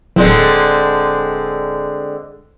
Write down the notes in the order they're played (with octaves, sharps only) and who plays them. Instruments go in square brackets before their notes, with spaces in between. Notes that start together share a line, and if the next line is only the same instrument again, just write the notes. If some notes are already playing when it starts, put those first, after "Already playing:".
[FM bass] D1 [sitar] D3 G#3 C4